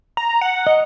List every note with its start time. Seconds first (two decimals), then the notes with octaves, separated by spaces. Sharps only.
0.17 A#5
0.41 F#5
0.67 D#5